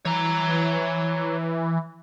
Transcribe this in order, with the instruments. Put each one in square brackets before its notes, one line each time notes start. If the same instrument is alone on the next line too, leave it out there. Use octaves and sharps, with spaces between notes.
[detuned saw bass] E3 [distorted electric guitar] C#5 A#5